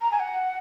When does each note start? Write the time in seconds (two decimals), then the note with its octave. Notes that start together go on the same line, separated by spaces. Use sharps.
0.01 A#5
0.11 G#5
0.20 F#5